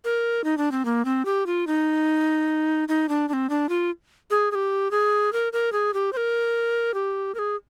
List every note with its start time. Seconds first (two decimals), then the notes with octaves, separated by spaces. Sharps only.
0.04 A#4
0.44 D#4
0.58 D4
0.72 C4
0.85 A#3
1.05 C4
1.25 G4
1.46 F4
1.67 D#4
2.88 D#4
3.09 D4
3.29 D4
3.33 C4
3.50 D4
3.69 F4
4.31 G#4
4.51 G#4
4.55 G4
4.91 G#4
5.33 A#4
5.53 A#4
5.72 G#4
5.94 G4
6.13 C5
6.17 A#4
6.94 G4
7.35 A#4
7.39 G#4